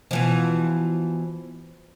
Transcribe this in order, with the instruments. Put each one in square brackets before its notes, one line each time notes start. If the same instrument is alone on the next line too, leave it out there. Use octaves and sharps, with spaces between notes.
[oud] B2 E3 F3